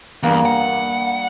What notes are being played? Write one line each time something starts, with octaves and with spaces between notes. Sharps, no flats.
E2 G2 A#3
F#5